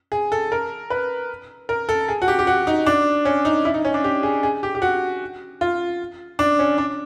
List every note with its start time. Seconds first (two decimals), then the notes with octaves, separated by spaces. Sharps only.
0.12 G#4
0.32 A4
0.52 A#4
0.90 B4
1.69 A#4
1.89 A4
2.08 G#4
2.22 F#4
2.28 G4
2.39 G4
2.47 F#4
2.67 D#4
2.86 D4
3.25 C#4
3.45 D#4
3.65 E4
3.74 D#4
3.85 C#4
3.94 D4
4.04 G4
4.23 G#4
4.43 G#4
4.63 G4
4.75 G4
4.82 F#4
5.61 F4
6.39 D4
6.59 C#4
6.78 D4